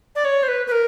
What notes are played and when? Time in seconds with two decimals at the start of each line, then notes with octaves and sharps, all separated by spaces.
0.16 D5
0.25 C#5
0.43 C5
0.48 B4
0.67 B4
0.72 A#4